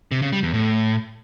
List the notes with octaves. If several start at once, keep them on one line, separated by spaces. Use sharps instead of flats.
C3
C#3
G3
E2
A2